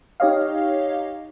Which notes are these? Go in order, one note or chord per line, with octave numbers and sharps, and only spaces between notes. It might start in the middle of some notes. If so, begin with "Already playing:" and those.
D#4 G4 C#5 D#5 F5